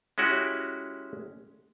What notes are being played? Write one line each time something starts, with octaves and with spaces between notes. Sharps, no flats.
G#3 C#4 E4 F#4 G4